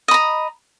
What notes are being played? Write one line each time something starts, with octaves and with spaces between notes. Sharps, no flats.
D#5 A#5 B5